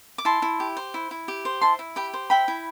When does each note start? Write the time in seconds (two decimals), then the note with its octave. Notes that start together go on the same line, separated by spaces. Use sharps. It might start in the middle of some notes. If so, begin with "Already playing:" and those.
0.18 D6
0.25 E4 A5 C6
0.42 E4
0.60 G4
0.77 C5
0.94 E4
1.11 E4
1.28 G4
1.45 C5
1.61 E4 A5 C6
1.79 E4
1.96 G4 G5 B5
2.14 C5
2.30 E4 G5 B5
2.48 E4